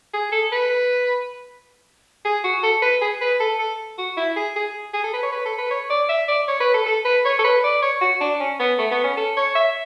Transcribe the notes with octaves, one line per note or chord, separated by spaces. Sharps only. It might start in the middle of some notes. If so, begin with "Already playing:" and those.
G#4
A4
B4
G#4
F#4
A4
B4
G#4
B4
A4
A4
F#4
E4
G#4
G#4
G#4
A4
B4
C#5
B4
A4
B4
C#5
D5
E5
D5
C#5
B4
A4
A4
B4
C#5
A4
B4
D5
C#5
F#4
D4
C#4
B3
A3
B3
C#4
A4
C#5
E5